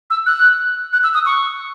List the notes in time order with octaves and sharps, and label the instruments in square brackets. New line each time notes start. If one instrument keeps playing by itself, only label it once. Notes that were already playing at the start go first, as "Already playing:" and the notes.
[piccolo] E6
F#6
F#6
E6
D#6
C#6